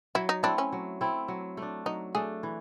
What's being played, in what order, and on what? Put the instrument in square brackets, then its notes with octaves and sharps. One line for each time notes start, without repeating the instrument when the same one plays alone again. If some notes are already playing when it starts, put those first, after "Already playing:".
[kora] F#3 [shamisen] E4
[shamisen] D#4
[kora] A3 C4 E4 [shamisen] D4
[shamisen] C#4
[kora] F#3
A3 C4 E4
F#3
A3 D4
[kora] F#3 [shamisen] D#4
[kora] A3 D4 [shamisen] G#4
[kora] E3